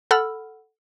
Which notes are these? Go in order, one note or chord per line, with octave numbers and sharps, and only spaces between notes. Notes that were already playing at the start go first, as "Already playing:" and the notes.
A4 F#5 B5 E6 F6